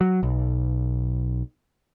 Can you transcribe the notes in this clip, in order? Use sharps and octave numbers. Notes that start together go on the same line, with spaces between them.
F#3
B1